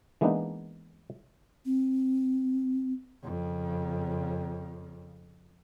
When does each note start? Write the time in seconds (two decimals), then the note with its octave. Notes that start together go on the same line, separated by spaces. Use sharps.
0.21 E3 G#3 A#3 B3 D4 D#4
1.65 C4
3.23 F2 C#3